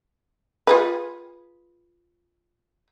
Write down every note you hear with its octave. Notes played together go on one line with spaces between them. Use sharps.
F4 G#4 B4